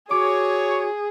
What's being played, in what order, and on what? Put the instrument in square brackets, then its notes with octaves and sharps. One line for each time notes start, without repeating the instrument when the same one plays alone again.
[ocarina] F#4 [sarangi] G#4 [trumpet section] C#5 [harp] D6